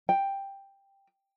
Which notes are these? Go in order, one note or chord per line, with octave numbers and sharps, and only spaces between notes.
G5